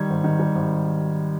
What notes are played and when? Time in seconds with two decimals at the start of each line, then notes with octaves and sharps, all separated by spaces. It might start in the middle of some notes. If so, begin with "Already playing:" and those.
Already playing: D#3 G3 G#6
0.10 G#1
0.24 D#3
0.40 G3
0.55 G#1